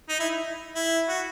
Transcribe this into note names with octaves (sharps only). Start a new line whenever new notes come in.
D#4
E4
E4
F#4